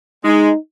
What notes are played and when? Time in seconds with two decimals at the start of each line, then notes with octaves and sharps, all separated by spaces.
0.24 G#3 D#4